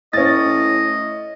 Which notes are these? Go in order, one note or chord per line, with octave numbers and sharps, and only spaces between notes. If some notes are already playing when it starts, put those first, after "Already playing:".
A2 C#4 D#5 A6